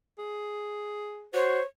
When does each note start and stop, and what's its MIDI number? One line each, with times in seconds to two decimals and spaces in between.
0.19 1.28 68
1.34 1.59 66
1.34 1.62 72
1.34 1.65 73